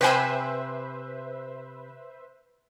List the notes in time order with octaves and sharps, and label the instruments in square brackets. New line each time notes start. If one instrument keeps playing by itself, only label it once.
[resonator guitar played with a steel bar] C3 G5 G#5 [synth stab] B4 C5 E5